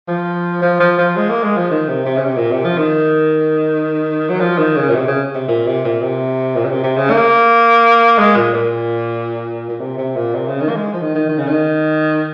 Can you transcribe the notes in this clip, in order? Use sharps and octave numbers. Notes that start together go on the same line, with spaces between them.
F3
F3
F3
F3
G#3
A#3
G#3
F3
D#3
C3
C3
C#3
C3
A#2
C3
F3
D#3
F#3
F3
D#3
C#3
A#2
C3
C#3
C3
A#2
C3
A#2
C3
A#2
C#3
C3
C3
C#3
A#3
G#3
A#2
A#2
A#2
C3
C3
A#2
C3
C#3
D#3
A#3
G#3
F3
D#3
D#3
D#3
C#3
D#3